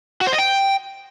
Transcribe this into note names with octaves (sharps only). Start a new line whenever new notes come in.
F#4
C5
D#5
G5